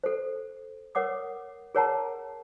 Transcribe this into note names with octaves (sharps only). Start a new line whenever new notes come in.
A4 C5
A#4 C#5 F#5 D6 D#6
G#4 A#4 C#5 F#5 A5 A#5